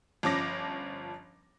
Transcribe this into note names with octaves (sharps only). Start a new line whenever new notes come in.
G1 F3 C#4 D6 A#6